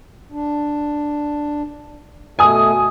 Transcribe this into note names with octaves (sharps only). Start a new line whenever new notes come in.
D4
B2 A3 G#5 D#6